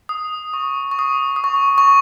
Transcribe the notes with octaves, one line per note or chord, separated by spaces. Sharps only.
D#6
C#6
C#6
D#6
D#6
C#6
C#6